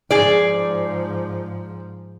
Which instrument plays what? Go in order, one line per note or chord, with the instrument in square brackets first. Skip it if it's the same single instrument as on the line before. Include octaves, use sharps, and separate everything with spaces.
[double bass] G#2 F3 [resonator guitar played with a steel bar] G#4 D5